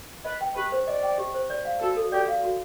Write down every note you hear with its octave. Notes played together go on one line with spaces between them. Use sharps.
B4 D#5
G5
G4 B4
C5
D5 D#5
G5
G4
C5
D5
F5
F#4 A4
A4
G4 D5
F5
F#4